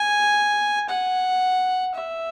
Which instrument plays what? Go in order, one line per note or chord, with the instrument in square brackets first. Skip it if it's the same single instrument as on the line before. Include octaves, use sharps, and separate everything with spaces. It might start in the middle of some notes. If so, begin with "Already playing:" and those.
Already playing: [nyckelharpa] G#5
F#5
E5